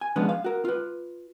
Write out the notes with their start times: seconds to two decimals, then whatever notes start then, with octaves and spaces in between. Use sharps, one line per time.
0.01 G#5
0.16 F3 G#3 B3 C#4 D4 B4
0.29 F5
0.44 F#4 A#4
0.65 F4 B4